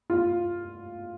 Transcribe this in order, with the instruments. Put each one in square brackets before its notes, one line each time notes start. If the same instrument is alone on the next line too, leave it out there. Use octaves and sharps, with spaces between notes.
[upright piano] F4